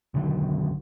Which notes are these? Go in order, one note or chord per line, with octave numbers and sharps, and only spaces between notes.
B1 D3 D#3 F#3